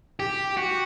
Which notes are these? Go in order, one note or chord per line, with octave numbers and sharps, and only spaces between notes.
G4
F#4